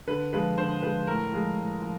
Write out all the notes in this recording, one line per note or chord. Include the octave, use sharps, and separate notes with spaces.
D3 B4
F3 G#3 B4
D3 C5
F3 G#3 B4
A2 A#4
F3 G#3
A2
F3